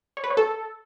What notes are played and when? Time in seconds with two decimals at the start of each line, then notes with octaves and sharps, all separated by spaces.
0.17 C#5
0.24 B4
0.30 C#5
0.37 A4